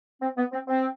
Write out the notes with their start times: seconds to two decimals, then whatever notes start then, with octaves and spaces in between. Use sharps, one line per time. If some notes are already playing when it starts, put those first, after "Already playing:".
0.22 C4
0.37 B3
0.52 C4
0.67 C4